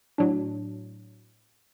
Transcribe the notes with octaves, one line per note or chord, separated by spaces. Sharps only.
A2 F#3 D4